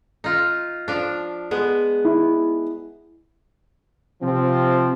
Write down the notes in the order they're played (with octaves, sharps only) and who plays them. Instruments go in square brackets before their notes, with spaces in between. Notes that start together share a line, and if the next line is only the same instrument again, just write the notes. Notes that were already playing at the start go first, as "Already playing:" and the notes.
[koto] D#4 F4
F3 D4
G#3 B3
[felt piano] E4
[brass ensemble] C3 F3 C4